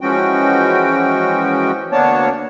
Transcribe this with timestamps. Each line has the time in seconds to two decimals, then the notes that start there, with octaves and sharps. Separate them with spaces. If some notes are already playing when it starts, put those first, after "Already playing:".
0.01 E3 F3 G#3 C#4 F#4 G5
1.92 D2 A#3 B3 D4 C#5 A5